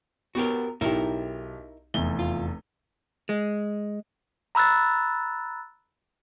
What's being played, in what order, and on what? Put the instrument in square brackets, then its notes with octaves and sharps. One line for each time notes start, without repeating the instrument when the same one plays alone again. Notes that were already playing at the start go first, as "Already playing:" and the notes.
[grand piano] B3 [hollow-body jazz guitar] F#4 G4 A#4
[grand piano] B1 G4 [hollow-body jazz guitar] D#4 E4 A#4
[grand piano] F1 E2 G7
[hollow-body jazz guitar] F4
G#3
[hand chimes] A#5 B5 E6 F#6 A6